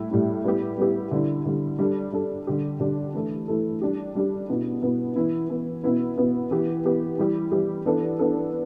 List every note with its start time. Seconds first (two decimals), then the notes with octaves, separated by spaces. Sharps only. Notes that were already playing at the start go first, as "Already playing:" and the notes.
Already playing: A2 G3 E4
0.11 A2 G3 E4
0.44 G3 B3 E4 G4
0.78 G3 B3 E4 G4
1.11 D3 G3 E4
1.45 D3 G3 E4
1.79 G3 D4 A4
2.12 G3 D4 A4
2.47 D3 G3 D4 G4
2.80 D3 G3 D4 G4
3.13 E3 A3 E4 A4
3.48 E3 A3 E4 A4
3.81 G3 D4 G4
4.15 G3 D4 G4
4.49 B2 B3 E4
4.82 B2 B3 E4
5.16 E3 B3 E4
5.49 E3 B3 E4
5.83 B2 B3 E4
6.17 B2 B3 E4
6.51 E3 B3 G4
6.85 E3 B3 G4
7.18 E3 G3 E4 G4
7.51 E3 G3 E4 G4
7.86 E3 B3 D4 A4
8.19 E3 B3 D4 A4